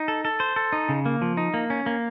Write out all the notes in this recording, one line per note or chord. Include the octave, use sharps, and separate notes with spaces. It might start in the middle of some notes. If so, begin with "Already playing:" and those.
Already playing: D#4
A4
A4
C5
A4
D#4
C#3
A#3
F3
D#4
A#3
C#4
A#3